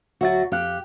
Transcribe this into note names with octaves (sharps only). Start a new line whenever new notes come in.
D2 F#3 F#4 E5 A6
F2 G4 F5 F#6